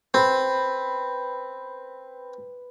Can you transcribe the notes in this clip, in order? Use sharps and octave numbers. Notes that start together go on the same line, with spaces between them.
C4 B4